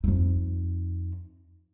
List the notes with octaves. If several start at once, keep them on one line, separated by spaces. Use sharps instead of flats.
F2 D#4